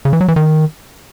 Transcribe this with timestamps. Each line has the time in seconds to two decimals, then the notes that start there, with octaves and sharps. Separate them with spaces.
0.05 C#3
0.13 E3
0.21 F#3
0.28 E3
0.36 D#3